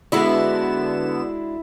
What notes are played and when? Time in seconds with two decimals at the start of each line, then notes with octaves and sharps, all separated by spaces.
0.12 D3 G#3 B3 D4 E4 F#4 E5 E7